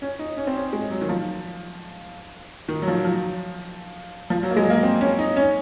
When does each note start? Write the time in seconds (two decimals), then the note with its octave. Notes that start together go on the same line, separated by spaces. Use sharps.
0.02 C#4
0.19 D#4
0.37 C#4
0.47 C4
0.55 C#4
0.73 G#3
0.91 F#3
1.01 D#3
1.09 F3
2.69 D#3
2.82 F#3
2.88 F3
3.05 F3
4.30 F3
4.43 F#3
4.51 A#3
4.57 G#3
4.70 A#3
4.83 C4
5.01 C#4
5.19 D#4
5.36 C#4